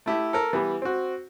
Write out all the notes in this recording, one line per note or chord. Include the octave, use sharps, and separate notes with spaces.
A3 E4 G4
A4 A#4
E3 G3 B3
C4 F#4